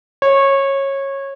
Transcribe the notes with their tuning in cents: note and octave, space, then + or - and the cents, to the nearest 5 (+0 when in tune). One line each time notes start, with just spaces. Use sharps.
C#5 -20